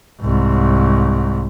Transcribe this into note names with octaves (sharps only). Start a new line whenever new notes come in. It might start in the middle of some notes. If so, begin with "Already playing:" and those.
C2 G#2